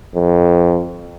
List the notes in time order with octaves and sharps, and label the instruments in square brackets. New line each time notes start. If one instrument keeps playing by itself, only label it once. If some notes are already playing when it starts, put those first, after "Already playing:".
[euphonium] F2